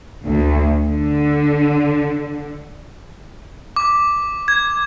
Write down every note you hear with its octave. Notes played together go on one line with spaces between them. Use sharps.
D2
D3
D6
G#6